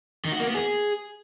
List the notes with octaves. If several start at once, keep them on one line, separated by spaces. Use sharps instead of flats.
D#3
F#4
A#3
B3
G#4